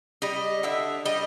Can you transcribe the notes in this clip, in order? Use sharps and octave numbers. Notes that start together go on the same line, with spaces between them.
G3 D#5
D3 E5
G3 D#5